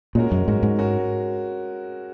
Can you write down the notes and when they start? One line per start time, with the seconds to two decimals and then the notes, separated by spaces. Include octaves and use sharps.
0.15 A#2 G#3 C#4 F#4 A#4
0.32 F#2
0.47 G#2 G#3 C#4 F#4 A#4
0.63 G#2
0.78 G#3 C#4 F#4 A#4